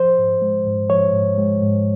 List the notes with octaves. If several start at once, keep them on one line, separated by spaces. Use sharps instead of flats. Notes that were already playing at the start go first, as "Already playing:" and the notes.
Already playing: F3 C5
G#2
G#3
G#2
F3 C#5
G#2
G#3
G#2